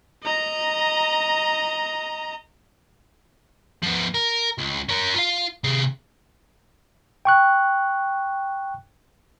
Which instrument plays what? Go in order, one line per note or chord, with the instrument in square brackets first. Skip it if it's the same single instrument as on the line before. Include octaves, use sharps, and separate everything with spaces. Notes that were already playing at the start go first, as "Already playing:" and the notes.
[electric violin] D#5 A#5
[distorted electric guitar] F3 B3
A#4
C#2
C#4 A#4
F4 F5
C3 G#4
[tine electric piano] G5 C#6 F#6